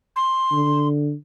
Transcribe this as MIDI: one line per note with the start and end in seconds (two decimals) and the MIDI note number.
0.15 0.87 84
0.52 1.14 50